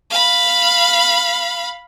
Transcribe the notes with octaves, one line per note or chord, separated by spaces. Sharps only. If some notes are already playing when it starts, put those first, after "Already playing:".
F5 B5